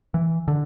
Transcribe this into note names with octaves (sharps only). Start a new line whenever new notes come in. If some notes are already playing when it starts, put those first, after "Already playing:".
E3
D3